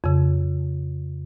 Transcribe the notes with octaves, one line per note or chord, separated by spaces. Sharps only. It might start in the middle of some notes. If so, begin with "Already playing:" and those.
F2 C#3